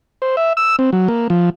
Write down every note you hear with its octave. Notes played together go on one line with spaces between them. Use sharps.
C5
E5
E6
C4
F#3
A#3
F3